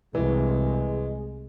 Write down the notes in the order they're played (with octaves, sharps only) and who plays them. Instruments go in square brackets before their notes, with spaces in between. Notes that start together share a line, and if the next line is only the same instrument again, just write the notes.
[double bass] C2 [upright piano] E3 [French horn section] G#3